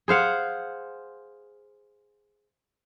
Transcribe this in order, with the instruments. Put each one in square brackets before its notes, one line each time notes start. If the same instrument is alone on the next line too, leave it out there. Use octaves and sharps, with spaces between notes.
[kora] G#4 C5 F5 F#5